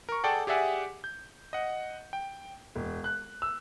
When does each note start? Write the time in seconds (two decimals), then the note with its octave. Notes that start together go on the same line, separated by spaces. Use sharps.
0.09 A#4 C#6
0.24 G#4 A4 D5 F#5 G5 A5
0.47 G4 G#4 D5 E5 F#5 G#5
1.04 G6
1.53 D#5 F#5
2.13 G5
2.76 E1
3.04 F#6
3.42 E6